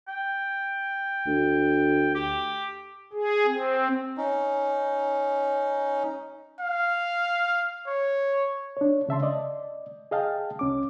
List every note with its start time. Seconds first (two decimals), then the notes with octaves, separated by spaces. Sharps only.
0.08 G5
1.27 D2
2.15 G4
3.13 G#4
3.46 C4
4.17 C#4 D#4
6.60 F5
7.87 C#5
8.77 D4 C#5
9.09 C#3 E5 A5 C6
9.22 D5 D#5
10.11 G#4 D#5 F5 G5 A5
10.59 C2 C#4 D6